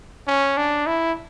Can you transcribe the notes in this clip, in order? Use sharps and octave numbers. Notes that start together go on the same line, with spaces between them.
C#4
D4
E4